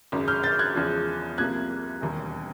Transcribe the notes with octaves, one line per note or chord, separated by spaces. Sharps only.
G#1 F#2 C#3
F6 G6
G6 A6
F#6 G#6
E2 C#3 F3 G#3
C2 C3 F3 A#3 F#6 G#6
E1 D#2 D#3 G3